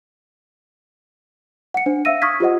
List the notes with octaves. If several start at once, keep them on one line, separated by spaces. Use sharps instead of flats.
F#5 C#7
D4 C5
E5 F5 E6 A#6 D#7
C#6 D#6 F6 G#6 B6
F4 G4 C5 D#5 F#5